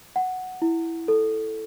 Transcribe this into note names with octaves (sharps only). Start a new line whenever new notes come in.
F#5
E4
A4